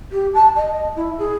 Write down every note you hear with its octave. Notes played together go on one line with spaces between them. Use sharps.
G4
A5
D#5
E4
G#4